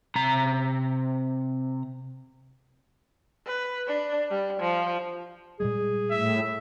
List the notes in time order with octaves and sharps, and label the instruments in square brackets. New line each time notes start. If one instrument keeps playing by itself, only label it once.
[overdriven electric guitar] C3 A#5
[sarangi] B4
D4
G3
F3
[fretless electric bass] A#2 G3 G#3 [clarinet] G#4
[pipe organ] A2 [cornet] E5